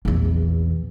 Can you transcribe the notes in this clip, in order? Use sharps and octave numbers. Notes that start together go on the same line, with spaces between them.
A#1 E2